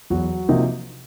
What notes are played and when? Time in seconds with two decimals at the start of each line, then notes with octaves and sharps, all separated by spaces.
0.10 E2 F#3 F#4
0.49 C3 F3 A#3 D#4